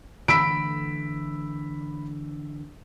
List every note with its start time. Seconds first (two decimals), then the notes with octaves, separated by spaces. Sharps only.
0.28 D3 E3 A3 B5 E6 B6 D7